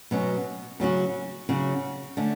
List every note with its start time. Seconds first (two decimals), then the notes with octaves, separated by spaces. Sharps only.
0.11 B2 F#3 C#4
0.80 C#3 F#3 C#4 F#4
1.49 C#3 F#3 C#4 F#4
2.17 D3 A3 C#4